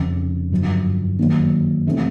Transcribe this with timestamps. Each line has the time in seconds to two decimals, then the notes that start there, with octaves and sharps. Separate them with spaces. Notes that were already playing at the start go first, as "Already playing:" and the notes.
Already playing: F1 F2 C#3
0.51 G1 F#2 D3 F3
1.19 F#2 D#3 F#3 A#3
1.87 C3 E3 A3 C#4